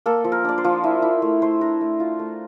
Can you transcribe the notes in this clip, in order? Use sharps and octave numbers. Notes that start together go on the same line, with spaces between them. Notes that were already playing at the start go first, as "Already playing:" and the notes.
A#3 A4
F3
A#4
D4 D5
C5
F3
E4 E5
E4
A3
A3 C5
D4 A#4
A3
F4
A3